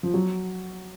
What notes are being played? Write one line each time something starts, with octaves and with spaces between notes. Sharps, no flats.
F3
F#3